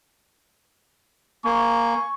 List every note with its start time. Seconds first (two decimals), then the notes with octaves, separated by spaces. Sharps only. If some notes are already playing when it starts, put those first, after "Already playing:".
1.45 A#3 G#5 C#6